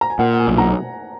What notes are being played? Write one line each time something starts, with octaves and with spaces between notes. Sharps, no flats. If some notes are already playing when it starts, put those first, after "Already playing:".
A#5
G#5
A#2 F#5
F#5
G#5
B1
F#5 A#5